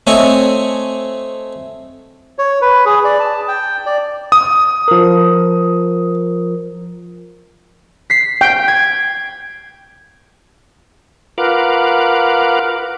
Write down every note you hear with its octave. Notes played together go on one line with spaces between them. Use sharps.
A3 C4 C#5 D#5 G#5
C#5
B4
G#4
D5
A5
G5
D5
D#6
F3 A#4
B6 C7
G5
G#6
F4 A#4 B4 F5 F#5 D6